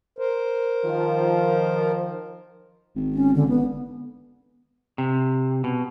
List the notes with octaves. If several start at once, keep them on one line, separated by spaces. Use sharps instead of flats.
A#4 C5
D#3 F3
G#1
C#4
D3
B3
C3
B2